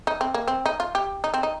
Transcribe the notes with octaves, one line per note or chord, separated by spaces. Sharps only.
D#4
C4
A#3
C4
D#4
F4
G4
D#4
C4
D#4